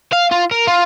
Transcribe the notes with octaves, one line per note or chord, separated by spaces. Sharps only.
F5
F4
A#4
F4